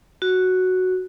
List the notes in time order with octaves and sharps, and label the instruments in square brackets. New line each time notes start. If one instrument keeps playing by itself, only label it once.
[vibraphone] F#4